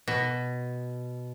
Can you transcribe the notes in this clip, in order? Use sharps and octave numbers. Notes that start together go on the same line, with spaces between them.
B2